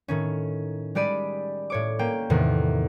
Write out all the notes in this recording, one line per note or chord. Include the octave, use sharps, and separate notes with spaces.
A2 D#3 C#4
G3 G#3 G4 D5 B5 D#7
A2 C#5 D6
A#3 C#4 G5
E2 A2 C3 D#3